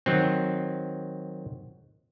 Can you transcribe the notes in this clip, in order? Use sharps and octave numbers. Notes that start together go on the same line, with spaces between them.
D#3 F#3 C4